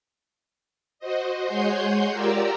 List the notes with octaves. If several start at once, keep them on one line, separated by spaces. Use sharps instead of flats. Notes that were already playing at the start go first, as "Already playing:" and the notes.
F#4 C5 D#5
G#3 C#5 F#5 G#5 C6 G6
F4 G4 A#4 D5 A#5 E6